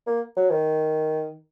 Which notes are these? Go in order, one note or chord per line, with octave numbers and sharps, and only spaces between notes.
A#3
F#3
D#3